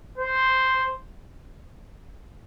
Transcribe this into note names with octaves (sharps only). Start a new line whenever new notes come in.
C5